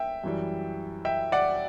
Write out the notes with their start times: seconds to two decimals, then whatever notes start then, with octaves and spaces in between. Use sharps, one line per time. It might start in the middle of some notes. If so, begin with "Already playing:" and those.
Already playing: E5 G5
0.24 F#2 E3 G3
1.05 E5 G5
1.32 D5 F#5